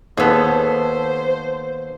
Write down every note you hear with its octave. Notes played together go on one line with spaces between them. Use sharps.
D#2 B3 G#4 A4 C5